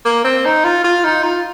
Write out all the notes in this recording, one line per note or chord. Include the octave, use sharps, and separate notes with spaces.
A#3
C4
D#4
F4
F4
D#4
F4